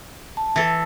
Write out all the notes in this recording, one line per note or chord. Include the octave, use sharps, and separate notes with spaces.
A5
E3 A4